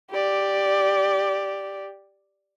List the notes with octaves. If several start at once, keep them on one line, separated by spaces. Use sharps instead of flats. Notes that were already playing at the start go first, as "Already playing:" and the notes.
G4 D5